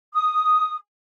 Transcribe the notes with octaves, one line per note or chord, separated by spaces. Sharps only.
D#6